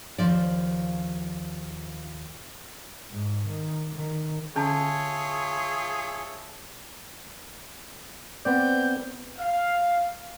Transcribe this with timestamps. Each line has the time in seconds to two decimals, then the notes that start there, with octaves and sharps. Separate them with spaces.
0.18 D#2 F3 D5
3.10 G#2
3.48 D#3
3.95 D#3
4.56 D3 C#4 F4 G#4 C#5 E5 A5 A#5
8.45 B3 C4 D5 G6
9.38 F5